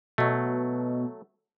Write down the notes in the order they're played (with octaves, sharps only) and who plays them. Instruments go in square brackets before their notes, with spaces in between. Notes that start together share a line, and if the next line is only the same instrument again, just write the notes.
[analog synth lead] B2 [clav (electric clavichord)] F#3 A3